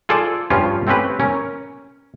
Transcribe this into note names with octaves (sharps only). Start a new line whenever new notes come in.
F4 G#4 A4 C5 D5
G2 F3 C#4 F4
A3 C4 C#4 G4 B4
C#4 A#4